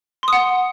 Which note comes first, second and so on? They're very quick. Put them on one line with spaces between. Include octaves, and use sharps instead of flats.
C6 D#6 F#5